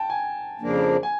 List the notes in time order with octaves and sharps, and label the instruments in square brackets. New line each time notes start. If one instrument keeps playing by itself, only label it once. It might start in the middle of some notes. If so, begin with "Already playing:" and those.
Already playing: [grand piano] G5 A5
G#5
[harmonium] F2 C#3 F3 A#3 D4
[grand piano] G#5